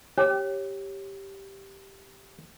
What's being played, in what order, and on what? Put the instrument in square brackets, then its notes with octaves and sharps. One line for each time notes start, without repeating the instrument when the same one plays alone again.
[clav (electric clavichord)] G4 [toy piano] C#5